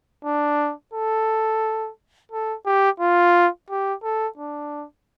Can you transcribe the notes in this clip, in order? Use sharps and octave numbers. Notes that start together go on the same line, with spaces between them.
D4
A4
A4
G4
F4
G4
A4
D4